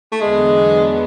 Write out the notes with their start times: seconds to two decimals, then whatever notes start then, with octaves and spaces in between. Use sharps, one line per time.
0.12 A3
0.20 E2 D3 F#3 G#3 B3 D4